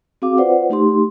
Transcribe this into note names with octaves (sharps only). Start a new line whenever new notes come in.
C4 F#4 G#4 F5 D6
F4 B4 C5 D5 F#5
A3 D#4 G4 C6